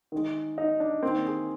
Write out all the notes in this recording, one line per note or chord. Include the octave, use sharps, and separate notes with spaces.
D#3 G#3
D#4
D4
D#3 A#3 C4
G#4